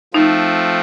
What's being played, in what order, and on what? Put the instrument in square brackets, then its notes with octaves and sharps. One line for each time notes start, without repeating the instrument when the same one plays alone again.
[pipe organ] F3 A3 C4 [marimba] D#4